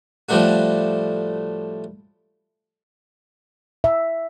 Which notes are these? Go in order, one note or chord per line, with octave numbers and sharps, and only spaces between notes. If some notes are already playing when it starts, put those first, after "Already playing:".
A2 F3 G3 A3 D4 F#4
E5